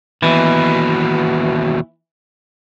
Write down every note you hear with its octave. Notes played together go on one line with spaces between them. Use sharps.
D#2 B2 E3